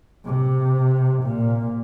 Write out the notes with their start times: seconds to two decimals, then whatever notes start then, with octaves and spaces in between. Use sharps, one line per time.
0.25 C3
1.22 A#2